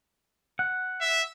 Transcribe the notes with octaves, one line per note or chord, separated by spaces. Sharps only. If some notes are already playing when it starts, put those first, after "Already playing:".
F#5
E5